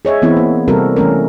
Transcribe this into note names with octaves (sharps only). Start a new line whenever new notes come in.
G#4 C#5 D#5 E5
E3 B3 C4 E4
A#3
C3 G3 C4 F#4 A4 A#4
E3 A3 C#4 A#4